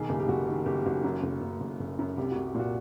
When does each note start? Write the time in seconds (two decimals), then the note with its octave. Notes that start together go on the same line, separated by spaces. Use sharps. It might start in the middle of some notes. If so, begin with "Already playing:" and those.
Already playing: B1 D#3 G#4
0.09 F#1 G4
0.20 G4
0.28 F#1 F#4
0.47 D#3
0.66 F#1 G4
0.81 G4
0.86 F#1 F#4
1.04 F#2
1.23 F#1
1.41 F#1
1.60 F#1
1.79 F#1
1.99 F#2
2.17 C2 G4
2.31 C2 F#4
2.45 G4
2.55 A#2 F#4